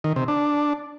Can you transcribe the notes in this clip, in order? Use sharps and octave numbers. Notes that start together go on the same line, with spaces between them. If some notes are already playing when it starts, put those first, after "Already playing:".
D#3
C3
D4